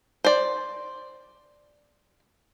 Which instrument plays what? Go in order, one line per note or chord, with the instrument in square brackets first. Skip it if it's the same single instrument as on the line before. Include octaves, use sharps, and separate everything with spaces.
[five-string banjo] C5 D5